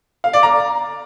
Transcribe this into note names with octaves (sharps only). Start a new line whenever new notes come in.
F5
D5
A#5